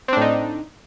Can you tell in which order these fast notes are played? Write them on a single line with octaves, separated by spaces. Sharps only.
C4 D4 A2 D#4